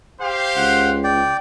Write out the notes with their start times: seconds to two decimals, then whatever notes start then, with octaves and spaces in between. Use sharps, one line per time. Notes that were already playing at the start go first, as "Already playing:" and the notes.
0.20 G4 C5 F5
0.56 C#2 F#5
1.04 D5 G5